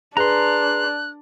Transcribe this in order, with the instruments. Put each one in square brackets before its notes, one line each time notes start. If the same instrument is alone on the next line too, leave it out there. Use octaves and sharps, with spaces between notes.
[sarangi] D4 [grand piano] G#4 B4 [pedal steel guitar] A#5 C6 [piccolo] F#6